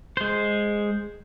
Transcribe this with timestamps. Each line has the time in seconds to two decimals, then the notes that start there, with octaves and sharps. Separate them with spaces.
0.17 G#3 C5